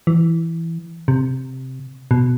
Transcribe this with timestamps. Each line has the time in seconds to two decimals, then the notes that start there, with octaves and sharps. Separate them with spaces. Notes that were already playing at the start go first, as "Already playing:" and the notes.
0.07 E3
1.08 C3
2.11 B2